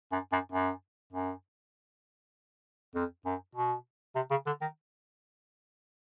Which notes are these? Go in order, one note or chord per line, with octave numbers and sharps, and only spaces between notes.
F#2
F#2
F#2
F#2
F2
F#2
B2
C3
C#3
D3
D#3